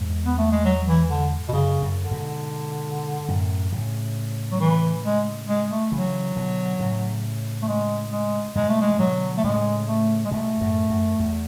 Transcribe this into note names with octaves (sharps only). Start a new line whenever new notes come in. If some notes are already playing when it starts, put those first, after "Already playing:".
Already playing: E2 G#2
B3
A3
G#3
F#3
E3
D3
B2
F#2 C#3
F#2
D3
G#2 B2
F#2 A2
A2 C#3
F#3
E3
G#3
G#3
A3
C#3 E3 F#3
B2 D3
A2 C#3
A3
G#3
G#3
G#2 B2 G#3
A3
G#3
E3
B2 D3 F#3
A3
A2 C#3 G#3
A3
G#3
G#2 B2 A3
F#2 A2
F#2
E2